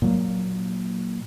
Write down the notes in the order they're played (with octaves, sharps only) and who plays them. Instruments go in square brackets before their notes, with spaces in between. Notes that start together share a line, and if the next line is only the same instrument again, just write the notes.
[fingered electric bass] A#2 F#3 A#3